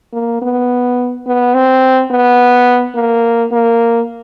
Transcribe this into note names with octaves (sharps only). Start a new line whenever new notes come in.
A#3
B3
B3
C4
B3
A#3
A#3